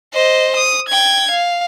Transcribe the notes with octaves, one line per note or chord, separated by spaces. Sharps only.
C5 D#5
D#6
G5 G#6
F5